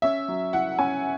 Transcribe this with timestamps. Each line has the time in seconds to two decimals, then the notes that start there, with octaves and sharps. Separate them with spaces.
0.02 C#4 E5
0.28 F#3
0.53 E4 F#5
0.78 C#4 G#5